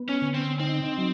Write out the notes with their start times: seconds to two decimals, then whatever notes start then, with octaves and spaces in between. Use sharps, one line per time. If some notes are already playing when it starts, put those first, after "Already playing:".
Already playing: B3
0.09 C#4
0.22 D3
0.34 C4
0.59 C4 D#4
0.98 F#3